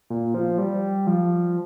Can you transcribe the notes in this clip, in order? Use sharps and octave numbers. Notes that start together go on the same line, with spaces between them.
A#2
F3
G3
F3